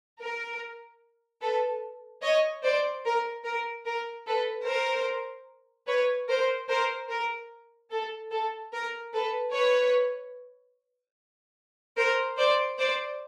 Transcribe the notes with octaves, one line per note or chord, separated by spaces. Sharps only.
A#4
A4 B4
C#5 D#5
C5 D5
A#4
A#4
A#4
A4 B4
A#4 C5
B4 C#5
A#4 C5
A#4 C5
A#4
A4
A4
A#4
A4 B4
B4 C#5
A#4 C5
C5 D5
C5 D5